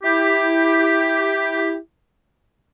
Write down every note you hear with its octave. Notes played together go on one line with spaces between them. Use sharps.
E4 G4